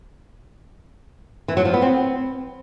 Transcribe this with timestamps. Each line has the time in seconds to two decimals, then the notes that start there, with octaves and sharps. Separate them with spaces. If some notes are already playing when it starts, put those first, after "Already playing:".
1.48 E3
1.57 F#3
1.65 F3
1.74 B3
1.82 C4